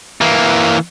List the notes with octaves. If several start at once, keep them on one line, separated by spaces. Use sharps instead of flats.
E3 A#3